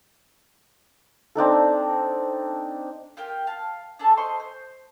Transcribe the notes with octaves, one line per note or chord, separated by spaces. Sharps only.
C4 D4 D#4 A4
F4 G4 A#4 G5
F5 A5
D4 G#4 A4 A5
C5 D#5 C6 C#6
C5